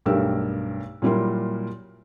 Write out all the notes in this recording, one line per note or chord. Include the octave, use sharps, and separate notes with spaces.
B1 G2 A3 G4 A#4 E6
A#2 F#3 G3 E4 A#4 C6